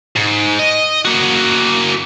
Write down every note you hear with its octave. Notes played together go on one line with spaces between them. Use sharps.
G#2
D#5
A#3 F#4